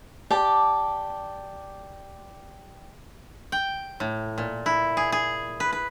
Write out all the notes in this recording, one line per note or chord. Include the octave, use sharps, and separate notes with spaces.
G4 D5 A5
G5
A2
A#2
E4
G#4
G#4
B4
B4